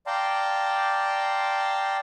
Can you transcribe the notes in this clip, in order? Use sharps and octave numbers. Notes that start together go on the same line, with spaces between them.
D5 F5 G5 A5 A#5 C6